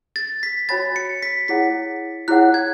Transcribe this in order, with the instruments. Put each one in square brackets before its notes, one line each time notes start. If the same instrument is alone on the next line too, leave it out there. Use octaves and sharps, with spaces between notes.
[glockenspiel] A6
B6
[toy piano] F#4 C#5 G#5 B5 [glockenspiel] A6
[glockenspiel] C#7
B6
[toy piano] E4 G#4 C#5 F#5 [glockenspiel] B6
[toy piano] E4 G#4 C#5 F#5 [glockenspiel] F#6
[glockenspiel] G#6